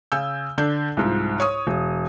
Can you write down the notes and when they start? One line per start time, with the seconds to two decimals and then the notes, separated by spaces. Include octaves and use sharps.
0.12 C#3 G#5 E6 G6
0.58 D3 D4 G6
0.97 C2 G#2 F3
1.40 C#5 C#6 D#6
1.67 E1